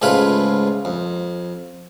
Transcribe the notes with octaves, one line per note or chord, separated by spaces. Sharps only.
C#2 G#2 A3 F4 B4 B5
F2